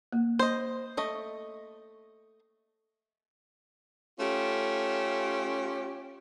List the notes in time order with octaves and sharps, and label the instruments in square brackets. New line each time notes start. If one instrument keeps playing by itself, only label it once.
[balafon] A#3
[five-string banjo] C5 D#5
[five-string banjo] A3 D#5 [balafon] C#6
[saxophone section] A3 C#4 F4 G4